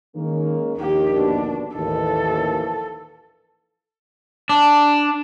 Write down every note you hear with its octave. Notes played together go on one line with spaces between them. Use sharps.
D#3 G#3 A#3 C#4
A#1 D#2 D#3 A#3 G4
B2 D3 D4
A1 D#2 A#2 E3 F3 A4
D4